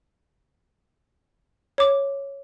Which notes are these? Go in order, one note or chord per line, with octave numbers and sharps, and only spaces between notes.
C#5 D6